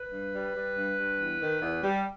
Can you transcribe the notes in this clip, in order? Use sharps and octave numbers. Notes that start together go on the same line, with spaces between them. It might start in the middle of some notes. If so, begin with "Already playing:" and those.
Already playing: B4
G2
G3
G3
G2
G2
E2
D#3
E2
G3